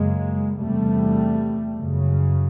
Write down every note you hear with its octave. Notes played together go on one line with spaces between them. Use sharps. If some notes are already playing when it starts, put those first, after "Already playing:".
Already playing: F#2 C#3 G#3 A#3
E2 C3 G3 A3
F#2 C#3